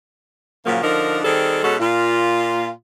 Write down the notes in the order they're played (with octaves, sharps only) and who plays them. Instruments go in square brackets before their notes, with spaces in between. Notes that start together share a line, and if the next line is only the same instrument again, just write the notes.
[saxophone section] A#2 C#3 F3 F#3 A#3
D3 F3 D4 D#4 A#4
D#3 G3 C4 G#4 A4
B2 G#3 C#4 F#4 A4
A#2 F4